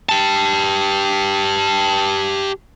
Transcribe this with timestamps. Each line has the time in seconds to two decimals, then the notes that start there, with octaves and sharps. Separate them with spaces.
0.09 G4 A5